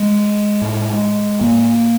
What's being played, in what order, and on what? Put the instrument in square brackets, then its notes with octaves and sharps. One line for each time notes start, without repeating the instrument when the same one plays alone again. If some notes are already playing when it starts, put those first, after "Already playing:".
Already playing: [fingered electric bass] G#3
A2
A2 A#3